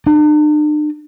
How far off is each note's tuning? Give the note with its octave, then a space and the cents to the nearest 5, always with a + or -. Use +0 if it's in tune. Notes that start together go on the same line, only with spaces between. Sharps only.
D4 +45